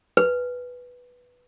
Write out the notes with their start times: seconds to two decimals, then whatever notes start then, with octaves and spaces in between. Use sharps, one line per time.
0.17 B4